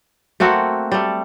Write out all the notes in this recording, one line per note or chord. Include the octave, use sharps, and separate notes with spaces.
A3 A#3 C4 F#4
G3 A3